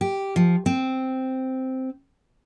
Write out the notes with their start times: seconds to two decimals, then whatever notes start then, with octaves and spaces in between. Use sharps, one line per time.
0.01 G4
0.36 F3
0.66 C4